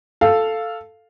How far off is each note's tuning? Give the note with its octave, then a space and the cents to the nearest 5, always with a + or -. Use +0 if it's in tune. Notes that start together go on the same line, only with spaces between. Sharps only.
A4 +0 F5 -5